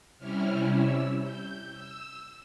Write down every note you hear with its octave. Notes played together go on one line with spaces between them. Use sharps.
C3 G3 C#4 E4 F6
E6
G6
E6